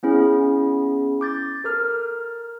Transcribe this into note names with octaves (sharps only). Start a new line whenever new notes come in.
B3 C#4 E4 G#4
D6 G6 A6
A4 A#4 F6